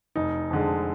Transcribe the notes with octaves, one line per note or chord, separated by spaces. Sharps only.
F1 D#4
F2 D3 G#3